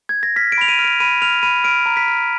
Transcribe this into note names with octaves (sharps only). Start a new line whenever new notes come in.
G#6
A#6
F6 B6
D7
B5 F7
D#7
F6
D7
B5 D#7
F6 F7
B5 D#7
F6 D7
A#5
B6
F6